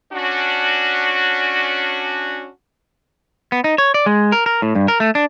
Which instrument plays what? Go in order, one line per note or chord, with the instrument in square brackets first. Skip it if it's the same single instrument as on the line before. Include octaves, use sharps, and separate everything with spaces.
[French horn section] C#4 D4 F#4
[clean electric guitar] B3
D#4
C#5
D5
G#3
A#4
A#4
A2
G2
A#4
A3
D4